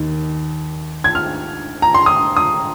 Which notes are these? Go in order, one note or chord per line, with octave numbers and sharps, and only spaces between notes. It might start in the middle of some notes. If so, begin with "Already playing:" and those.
Already playing: D#2 D#3
G#6
F6
A#5
C6
D#6
D#6